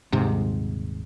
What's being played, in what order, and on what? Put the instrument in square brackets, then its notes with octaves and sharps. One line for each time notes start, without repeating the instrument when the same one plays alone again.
[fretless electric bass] D#1 G#2 C3